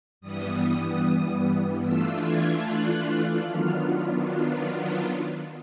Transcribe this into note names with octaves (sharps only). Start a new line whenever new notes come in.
G2 E3 G3 B3 D#6
E3 A3 D4 F4 E6
G#6
F#6
D#3 F#3 B3 D4 F4 F6